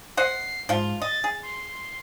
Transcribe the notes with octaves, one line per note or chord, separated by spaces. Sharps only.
C5 D#5 F#5 C7
G#2 F3 F4
D#5 A6
G#4
C6